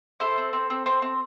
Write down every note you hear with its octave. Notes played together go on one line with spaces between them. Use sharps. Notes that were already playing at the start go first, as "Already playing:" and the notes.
E4 A4 C5
C4
C4
C4
C4
C4